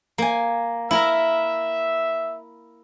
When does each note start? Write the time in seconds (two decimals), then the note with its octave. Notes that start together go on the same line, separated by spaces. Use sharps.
0.18 A#3 G#5
0.91 E4 A#4 E5 A#5